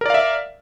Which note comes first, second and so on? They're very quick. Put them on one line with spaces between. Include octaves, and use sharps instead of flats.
A#4 D5 F5 E5